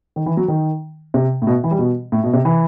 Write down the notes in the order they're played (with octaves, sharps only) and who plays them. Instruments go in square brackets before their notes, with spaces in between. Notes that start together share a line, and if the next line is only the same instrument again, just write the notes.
[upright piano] D#3
E3
F#3
D#3
C3
A2
B2
E3
G3
B2
A2
B2
C3
E3